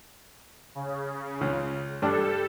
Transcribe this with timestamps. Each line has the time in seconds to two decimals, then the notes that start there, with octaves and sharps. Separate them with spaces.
0.75 C#3
1.41 C#2
2.02 G2 G3 D4 A4